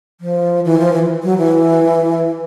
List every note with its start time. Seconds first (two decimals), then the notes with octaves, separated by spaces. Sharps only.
0.21 F3
0.65 E3
0.79 F3
0.93 E3
1.23 F#3
1.38 E3